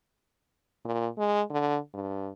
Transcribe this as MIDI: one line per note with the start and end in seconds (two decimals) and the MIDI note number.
0.85 1.08 46
1.18 1.42 56
1.50 1.77 50
1.94 2.30 43